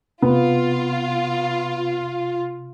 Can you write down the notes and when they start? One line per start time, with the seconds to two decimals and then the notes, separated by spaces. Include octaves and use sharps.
0.23 C3 B3 F4